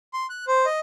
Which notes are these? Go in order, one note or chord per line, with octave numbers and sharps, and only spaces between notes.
C6
F#6
C5
D#5